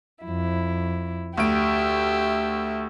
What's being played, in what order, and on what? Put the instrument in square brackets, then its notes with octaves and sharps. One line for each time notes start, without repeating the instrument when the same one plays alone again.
[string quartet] F2 E4
[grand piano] D2 D7 [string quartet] G4 E5